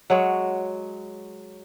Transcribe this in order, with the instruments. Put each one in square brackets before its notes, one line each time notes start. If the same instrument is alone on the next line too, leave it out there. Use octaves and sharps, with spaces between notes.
[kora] F#3 G#3 C#5